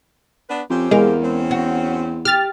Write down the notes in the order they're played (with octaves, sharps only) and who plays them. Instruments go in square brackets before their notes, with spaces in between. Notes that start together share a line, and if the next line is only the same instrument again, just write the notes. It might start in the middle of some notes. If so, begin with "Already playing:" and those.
[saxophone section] B3 D4 B4
[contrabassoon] F2 [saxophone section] C4 C#4 G4
[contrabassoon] E2 [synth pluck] G#3 [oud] A#4 F5
[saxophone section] C4 C#4
[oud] F#4
[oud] G4 [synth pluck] F6 A6